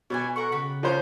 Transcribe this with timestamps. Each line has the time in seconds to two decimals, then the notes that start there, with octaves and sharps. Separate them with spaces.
0.10 B2 C#5 D5 G#5
0.36 A4 A#4 F#5 C#6
0.52 C#3 F#4 G4 B5
0.83 F3 C#4 C5